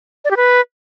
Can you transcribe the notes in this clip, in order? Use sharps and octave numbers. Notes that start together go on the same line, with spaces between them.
D5
G4
B4